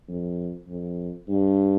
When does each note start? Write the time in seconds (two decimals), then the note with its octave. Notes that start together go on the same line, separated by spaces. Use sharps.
0.08 F2
0.68 F2
1.28 G2